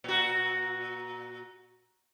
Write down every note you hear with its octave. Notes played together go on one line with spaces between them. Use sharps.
A#2 F#4